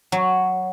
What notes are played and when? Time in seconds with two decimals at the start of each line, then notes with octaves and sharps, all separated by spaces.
0.12 F#3